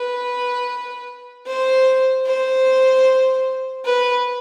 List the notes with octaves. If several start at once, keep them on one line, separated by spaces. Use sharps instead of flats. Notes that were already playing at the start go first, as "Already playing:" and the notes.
Already playing: B4
C5
C5
B4